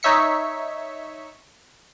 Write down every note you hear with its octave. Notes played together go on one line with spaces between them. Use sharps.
D#4 C#5 E5 B6 C#7